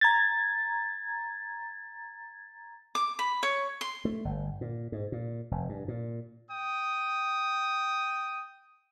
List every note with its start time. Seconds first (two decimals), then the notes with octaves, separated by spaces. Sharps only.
0.01 A#5 G#6 A6
2.95 D6
3.19 B5
3.43 C#5
3.81 C6
4.05 A3
4.25 G1
4.61 A#2
4.92 G#2
5.12 A#2
5.51 F1
5.69 G2
5.88 A#2
6.50 G5 D#6